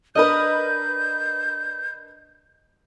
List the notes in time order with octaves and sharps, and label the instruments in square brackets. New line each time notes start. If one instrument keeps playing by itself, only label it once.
[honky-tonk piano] D4 A#4 B4 [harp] D#5 A#5 [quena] G6